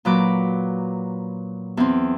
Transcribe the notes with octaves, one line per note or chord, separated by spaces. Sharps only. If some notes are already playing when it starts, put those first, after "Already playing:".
A#2 F#3 B4 D6
E2 C4